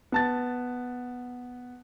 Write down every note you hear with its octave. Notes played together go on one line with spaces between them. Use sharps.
B3 A5 A6